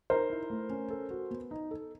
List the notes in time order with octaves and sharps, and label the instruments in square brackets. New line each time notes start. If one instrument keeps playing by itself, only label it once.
[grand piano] D#4 [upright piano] A#4 C5
[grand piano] E4
A3
C#4
A4
F#4
B3
D#4
A4